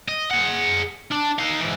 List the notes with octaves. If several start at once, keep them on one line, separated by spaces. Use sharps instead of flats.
D#5
G#4 F#5
D4
D#4 F5
G#2 E3